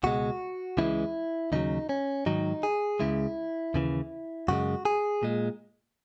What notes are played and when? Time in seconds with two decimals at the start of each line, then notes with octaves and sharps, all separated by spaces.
0.03 C#2 B2 G#3 F#4
0.77 C#2 C#3 E3 G#3 E4
1.52 D#2 C#3 F#3 D#4
1.89 C#4
2.26 G#2 D#3 F#3 D#4
2.63 G#4
3.00 C#2 C#3 G#3 E4
3.74 D#2 C#3 E3
4.48 F#2 C#3 G#3 F#4
4.85 G#4
5.23 A#2 G#3